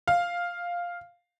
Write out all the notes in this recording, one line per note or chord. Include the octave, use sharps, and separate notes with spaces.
F5